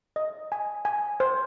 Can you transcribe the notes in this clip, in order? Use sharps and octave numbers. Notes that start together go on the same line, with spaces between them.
D#5
G#5
G#5
C5